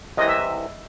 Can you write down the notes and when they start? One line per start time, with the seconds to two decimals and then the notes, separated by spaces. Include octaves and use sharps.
0.17 C2 C3 E3 D#5
0.28 E5